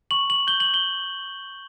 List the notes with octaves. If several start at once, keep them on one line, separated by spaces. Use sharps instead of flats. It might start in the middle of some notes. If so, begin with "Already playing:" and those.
C#6 F#7
F#7
G6 G7
F#7
G7